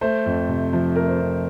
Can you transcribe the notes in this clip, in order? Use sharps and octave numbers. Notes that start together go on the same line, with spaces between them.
A3 C5
F2
C3
F3 C5
A3 A#4
C5
F2